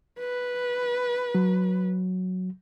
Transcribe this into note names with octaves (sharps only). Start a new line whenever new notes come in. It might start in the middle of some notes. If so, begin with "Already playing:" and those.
B4
F#3